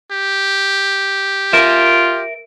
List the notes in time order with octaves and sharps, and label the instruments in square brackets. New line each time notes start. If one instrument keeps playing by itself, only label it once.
[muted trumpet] G4
[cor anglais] F4 [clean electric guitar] A#4 E5